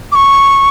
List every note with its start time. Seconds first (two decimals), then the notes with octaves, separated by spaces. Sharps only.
0.12 D6
0.15 C#6